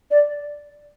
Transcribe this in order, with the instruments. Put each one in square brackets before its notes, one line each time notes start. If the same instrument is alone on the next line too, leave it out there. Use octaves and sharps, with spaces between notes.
[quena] D5